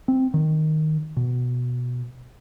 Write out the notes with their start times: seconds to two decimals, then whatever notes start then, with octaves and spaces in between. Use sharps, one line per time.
0.08 C4
0.34 D#3
1.17 B2